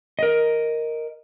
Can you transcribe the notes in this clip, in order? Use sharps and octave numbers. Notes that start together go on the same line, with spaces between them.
A#4 D#5